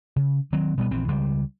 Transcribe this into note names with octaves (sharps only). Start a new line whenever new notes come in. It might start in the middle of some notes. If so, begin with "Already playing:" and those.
C#3
D#3 F#3 C4
B2 G3 B3
A#1 E3 C4
C#2 G3